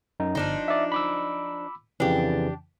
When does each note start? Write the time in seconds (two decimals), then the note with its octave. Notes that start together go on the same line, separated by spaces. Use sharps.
0.20 F#2 D#4
0.35 G1 F3 D4 D#4
0.68 D5 E5
0.92 B5 D6 E6
2.00 F2 C#3 E3 D4 G4